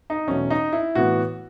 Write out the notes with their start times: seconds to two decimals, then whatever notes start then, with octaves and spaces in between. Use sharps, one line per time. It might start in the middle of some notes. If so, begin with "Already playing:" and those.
0.10 D#4
0.27 E2 B2 F#3 A3 C#4
0.50 D#4
0.73 E4
0.95 A2 E3 B3 F#4